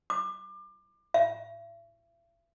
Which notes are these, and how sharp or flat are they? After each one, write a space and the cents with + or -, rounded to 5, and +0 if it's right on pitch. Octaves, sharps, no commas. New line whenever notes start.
D6 +30
E5 +40